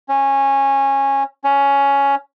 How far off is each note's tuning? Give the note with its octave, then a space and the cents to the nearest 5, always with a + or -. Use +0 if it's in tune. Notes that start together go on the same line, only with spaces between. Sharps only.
C#4 -15
C#4 +10